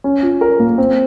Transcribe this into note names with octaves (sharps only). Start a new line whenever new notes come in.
C#4
F4
A#4
A#3
C4